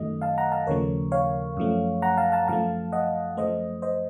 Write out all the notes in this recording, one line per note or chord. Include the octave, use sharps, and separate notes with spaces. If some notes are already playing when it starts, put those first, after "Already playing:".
Already playing: F#2 D#3 F#3 A3 D#5
F5 A5
F#5 A#5
F5 A5
D#2 C#3 F3 A3 A#4 C#5
C#5 F5
F#2 F3 A3
F#5 A#5
F5 A5
F5 A5
F#2 F3 A3 F5 A5
D#5 F#5
F#2 F3 A3 C5 D#5
C5 D#5